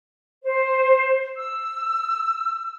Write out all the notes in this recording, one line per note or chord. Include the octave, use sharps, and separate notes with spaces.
C5
E6